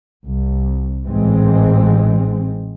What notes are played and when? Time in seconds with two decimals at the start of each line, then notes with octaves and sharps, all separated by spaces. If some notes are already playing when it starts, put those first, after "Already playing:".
0.25 C2
1.06 A1 G#2 E3 G#3 C4